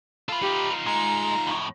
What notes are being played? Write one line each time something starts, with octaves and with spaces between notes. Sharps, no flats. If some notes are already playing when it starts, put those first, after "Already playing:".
F4 A4 B4
D#4 F4 G4
G#3 A#5
F2 A2